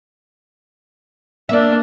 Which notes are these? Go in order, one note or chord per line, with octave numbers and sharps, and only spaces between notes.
A#3 D4 D5 E5